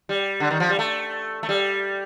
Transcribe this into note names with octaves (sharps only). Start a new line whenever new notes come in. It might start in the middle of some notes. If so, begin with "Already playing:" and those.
G3
D3
D#3
F3
G3
A3
A3
G3